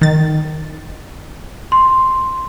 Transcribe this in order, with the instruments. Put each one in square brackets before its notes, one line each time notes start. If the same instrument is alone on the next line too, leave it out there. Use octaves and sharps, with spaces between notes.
[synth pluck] D#3 A6
[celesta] C6